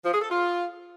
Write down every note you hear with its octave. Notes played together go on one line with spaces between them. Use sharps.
F3
G#4
A4
F4